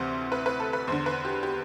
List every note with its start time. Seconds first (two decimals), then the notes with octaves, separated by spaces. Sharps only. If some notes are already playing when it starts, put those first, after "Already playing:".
Already playing: D2 C3 E3 C5
0.32 B4
0.46 B4
0.60 A4
0.73 B4
0.87 E2 D3 C5
1.06 B4
1.25 G4
1.43 G4